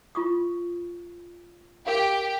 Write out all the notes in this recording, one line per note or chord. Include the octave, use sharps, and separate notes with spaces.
F4 C#6 D#6
G4 A#4 F5